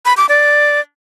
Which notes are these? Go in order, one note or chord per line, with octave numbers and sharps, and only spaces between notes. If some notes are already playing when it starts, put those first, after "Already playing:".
B5
D6
D5